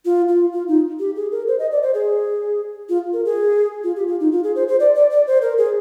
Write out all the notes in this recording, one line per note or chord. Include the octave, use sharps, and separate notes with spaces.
F4
F4
F4
D#4
G4
G#4
A#4
C5
D#5
D5
C5
G#4
F4
A#4
G#4
F4
G4
F4
D#4
F4
G#4
C5
C5
D5
D5
D5
C5
A#4
G#4